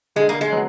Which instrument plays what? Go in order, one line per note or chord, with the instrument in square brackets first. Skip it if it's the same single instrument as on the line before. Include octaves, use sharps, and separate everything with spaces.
[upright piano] D3 [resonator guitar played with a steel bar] G#3
[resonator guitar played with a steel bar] A#3
G#3
[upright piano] F#3 B3